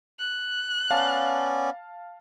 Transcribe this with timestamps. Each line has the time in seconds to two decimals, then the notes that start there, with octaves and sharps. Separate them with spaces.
0.19 F#6
0.91 B3 C#4 D5 F5 A5